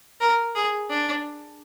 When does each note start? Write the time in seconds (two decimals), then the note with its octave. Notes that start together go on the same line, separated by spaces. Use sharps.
0.21 A#4
0.55 G#4
0.90 D4